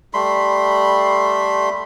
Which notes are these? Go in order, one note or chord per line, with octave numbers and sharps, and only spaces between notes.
G3 A3 B5 C6